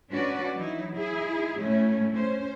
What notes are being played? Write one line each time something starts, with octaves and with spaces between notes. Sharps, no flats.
C#4 D4 F#4 B4 D5
E3 F#3 D#4 E4
E4 G#4
A2 A3 C#4 E4
C#4 C5